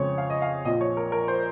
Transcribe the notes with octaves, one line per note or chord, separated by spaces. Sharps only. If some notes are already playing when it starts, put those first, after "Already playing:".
Already playing: F2 C#3 G#3 C4 C#5
F5
D#5
F5
A#1 A#2 F3 D#5
C#5
A#4
A#4
C5